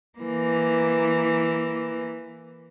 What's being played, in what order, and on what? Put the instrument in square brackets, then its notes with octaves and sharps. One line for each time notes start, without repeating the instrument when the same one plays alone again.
[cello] E3 A#3